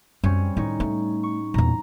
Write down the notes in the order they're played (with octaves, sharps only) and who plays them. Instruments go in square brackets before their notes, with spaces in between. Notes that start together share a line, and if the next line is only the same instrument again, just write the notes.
[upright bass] F#2 [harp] G3 C4 C#4
[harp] A2 D#4 C#5 [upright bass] D#3
[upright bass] A3
[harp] C#6
[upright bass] E2 A#2 [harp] A#5